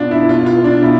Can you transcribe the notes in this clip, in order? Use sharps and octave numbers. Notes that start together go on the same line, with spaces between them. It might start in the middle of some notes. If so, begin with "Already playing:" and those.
Already playing: B2 D4 F4
E4
B2 F4
F4
D4
B2 E4